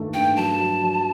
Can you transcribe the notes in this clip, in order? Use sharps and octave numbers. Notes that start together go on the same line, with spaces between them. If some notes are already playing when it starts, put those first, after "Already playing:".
Already playing: G2 D#3 A3 A#3
G2 G5
F#3 A5
F#3
F#3